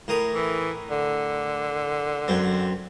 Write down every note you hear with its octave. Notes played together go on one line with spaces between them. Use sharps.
A2 A#4 D#6
E3
D3
F#2 C4